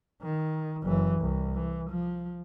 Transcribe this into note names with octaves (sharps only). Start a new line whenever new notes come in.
D#3
F#1 E3
C2
E3
F3